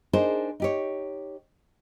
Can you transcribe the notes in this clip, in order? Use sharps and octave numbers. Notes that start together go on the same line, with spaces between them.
D4 D#4 G#4 A#4 C5
D#4 G4 C#5